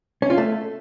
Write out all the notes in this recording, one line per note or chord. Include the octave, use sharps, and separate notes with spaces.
C#4
F4
A3